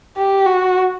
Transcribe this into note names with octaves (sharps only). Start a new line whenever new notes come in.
G4
F#4